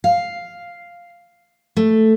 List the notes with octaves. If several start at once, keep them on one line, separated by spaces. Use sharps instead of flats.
F5
A3